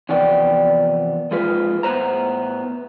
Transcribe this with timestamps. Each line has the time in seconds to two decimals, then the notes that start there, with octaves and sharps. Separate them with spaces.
0.09 E2 C3 F3 B3 D5 G5
1.31 F2 G#3 F4 B4
1.83 A2 B3 B4 C5 A#5